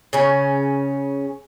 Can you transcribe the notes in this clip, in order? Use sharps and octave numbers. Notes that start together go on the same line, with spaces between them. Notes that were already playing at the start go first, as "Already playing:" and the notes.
C#3 C#4